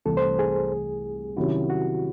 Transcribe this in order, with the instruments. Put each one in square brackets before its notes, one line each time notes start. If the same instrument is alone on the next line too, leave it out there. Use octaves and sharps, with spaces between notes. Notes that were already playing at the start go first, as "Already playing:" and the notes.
[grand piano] C2 C3 E3 A3 [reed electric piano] A4
[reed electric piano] C5
G#4
[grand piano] C3 D#3 F#3 C#4 E4 [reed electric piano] F#4
[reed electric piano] F#4